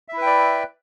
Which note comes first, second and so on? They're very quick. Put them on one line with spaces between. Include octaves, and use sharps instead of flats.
E5 E4 B4 G5 D5